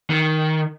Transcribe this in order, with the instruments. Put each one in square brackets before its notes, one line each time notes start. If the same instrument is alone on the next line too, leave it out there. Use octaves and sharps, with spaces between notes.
[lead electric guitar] D#3